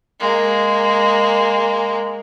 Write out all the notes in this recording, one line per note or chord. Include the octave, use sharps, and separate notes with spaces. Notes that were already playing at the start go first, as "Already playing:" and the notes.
G#3 A#3